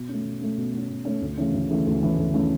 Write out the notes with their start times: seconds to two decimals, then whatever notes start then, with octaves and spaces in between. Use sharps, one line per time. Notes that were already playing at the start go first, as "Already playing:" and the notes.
Already playing: B2
0.09 A3 C#4
0.25 B2
0.41 A3 C#4
0.57 B2
0.73 A3 C#4
0.90 B2
1.05 A3 C#4
1.21 D2
1.37 C#3 E3 A3 C#4
1.53 D2
1.70 C#3 E3 A3 C#4
1.86 D2
2.02 C#3 E3 A3 C#4
2.18 D2
2.34 C#3 E3 A3 C#4